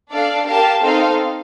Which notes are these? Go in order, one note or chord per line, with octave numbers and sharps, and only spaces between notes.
D4 A4 D5 F5
G4 A#4 F5 A5
C4 D#4 A4 C5 F5